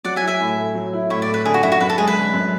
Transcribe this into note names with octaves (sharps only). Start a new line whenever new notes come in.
F#3 D5 F#5
E5 G#5
E4
E5 G#5
A2
A3
F#3
E4
A2 C#5 E5
D5
A3
B4
D3 G#4
F#4
F#2 E4
F#4
F#2 B4
A4
G#3 G#4
B4
D3
F#2